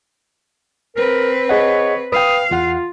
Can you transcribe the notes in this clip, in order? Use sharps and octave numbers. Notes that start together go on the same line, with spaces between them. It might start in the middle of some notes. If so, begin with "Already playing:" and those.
C4 A#4 B4
G#4 C#5 D#5 F#5
B4 F5 G5 D#6
E2 F4 F#5